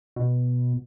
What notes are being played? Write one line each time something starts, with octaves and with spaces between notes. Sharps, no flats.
B2